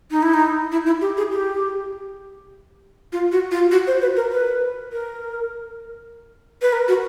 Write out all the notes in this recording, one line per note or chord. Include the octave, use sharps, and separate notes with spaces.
D#4
E4
D#4
E4
E4
G4
G#4
G4
F4
F#4
F4
F#4
C5
B4
A#4
B4
A#4
B4
A#4
F#4